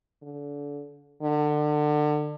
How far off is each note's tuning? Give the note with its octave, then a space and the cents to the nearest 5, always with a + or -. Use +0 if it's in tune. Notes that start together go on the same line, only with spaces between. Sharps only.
D3 -30
D3 +30